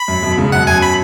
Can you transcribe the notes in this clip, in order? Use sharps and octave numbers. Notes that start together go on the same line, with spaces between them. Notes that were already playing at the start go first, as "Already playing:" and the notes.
Already playing: B5
F#2
F#2 B2
G#2 C#3
F#2 B2 F#5
F#2 B2 G#5
B5